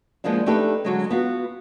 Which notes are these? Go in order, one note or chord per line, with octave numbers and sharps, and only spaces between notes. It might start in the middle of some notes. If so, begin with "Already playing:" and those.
F3 G#3 A#3 B3 D4
A3 D4 D#4 G4 A4 B4
D3 F#3 G#3
B3 F4 F#4